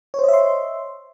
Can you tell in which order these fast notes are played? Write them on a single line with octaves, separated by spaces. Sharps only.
C#5 C5 D#5 E5 C6